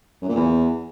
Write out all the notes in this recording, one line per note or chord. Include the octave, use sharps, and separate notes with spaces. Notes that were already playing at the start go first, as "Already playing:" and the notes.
F#2
A#2
E2